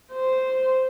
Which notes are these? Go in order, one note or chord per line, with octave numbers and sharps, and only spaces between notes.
C5